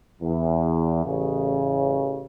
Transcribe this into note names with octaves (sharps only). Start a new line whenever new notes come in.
E2
A1 C#3